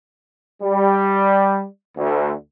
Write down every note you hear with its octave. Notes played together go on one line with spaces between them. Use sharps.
G3
D2